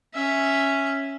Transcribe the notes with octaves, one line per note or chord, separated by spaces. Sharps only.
C#4 E5